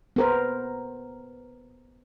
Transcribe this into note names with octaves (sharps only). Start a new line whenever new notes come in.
B3 A#4 C5